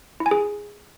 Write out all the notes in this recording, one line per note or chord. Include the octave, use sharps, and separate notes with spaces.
E4
G#5
G#4